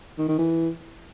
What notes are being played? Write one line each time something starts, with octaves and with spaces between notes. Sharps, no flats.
D#3
D#3
E3